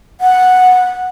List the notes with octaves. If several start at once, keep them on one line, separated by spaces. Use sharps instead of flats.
F#5